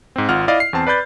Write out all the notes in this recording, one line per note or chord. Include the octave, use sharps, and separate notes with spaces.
G#2 C4
G#1 F4 F#5 F6
E4 D5 D#5 F5
C7
E2 C4 A5
B4 D5 B5 G6 A6